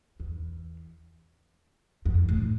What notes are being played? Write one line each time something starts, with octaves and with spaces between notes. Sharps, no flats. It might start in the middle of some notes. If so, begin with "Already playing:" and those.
E2
F2
A2